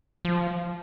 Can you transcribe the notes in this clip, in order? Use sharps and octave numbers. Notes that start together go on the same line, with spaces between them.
F3